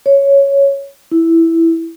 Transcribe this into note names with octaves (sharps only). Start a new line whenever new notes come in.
C#5
E4